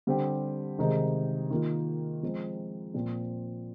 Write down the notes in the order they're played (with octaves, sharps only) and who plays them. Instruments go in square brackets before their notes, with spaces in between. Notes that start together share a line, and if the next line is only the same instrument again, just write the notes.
[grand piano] D3 G3 C4 G4
C3 D#3 G#3 D#4 G#4
D#3 A#3 F4
F3 G#3 C4
A#2 F3 C4